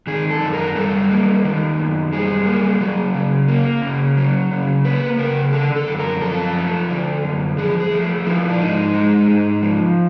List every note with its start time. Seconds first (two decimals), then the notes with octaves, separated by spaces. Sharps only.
0.07 D#3 G#4
0.30 A4
0.41 F#2
0.53 A#4
0.75 G3 A4
1.11 A#3
1.44 D#3
1.78 F#2
2.13 G3 G#4
2.46 A#3
2.81 F#3
3.15 C#3
3.48 A#3
3.82 C#3
4.17 F#3
4.51 C#3
4.85 A#3 B4
5.19 C#3 A#4
5.53 D3 A4
5.76 A4
5.87 F#2
5.99 A#4
6.21 F3 A4
6.55 A3
6.90 D3
7.24 F#2
7.58 F3 G#4
7.80 G#4
7.92 A3
8.26 F3 E4
8.50 D4
8.60 G#2 D#4
8.94 G#3
9.28 G#2
9.62 F3